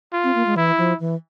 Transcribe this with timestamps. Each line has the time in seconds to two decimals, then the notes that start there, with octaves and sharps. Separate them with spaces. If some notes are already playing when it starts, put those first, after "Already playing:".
0.13 F4
0.24 C4
0.35 A#3
0.46 G#3
0.56 E3 E4
0.78 F3
1.00 E3